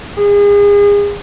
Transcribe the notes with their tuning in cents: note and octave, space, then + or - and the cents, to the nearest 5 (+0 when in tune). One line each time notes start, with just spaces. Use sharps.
G#4 -35